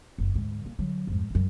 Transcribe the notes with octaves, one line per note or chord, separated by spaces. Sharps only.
F#1
D2 G#2
A#3
D3 F#3
F2 G#2
C#2 F#2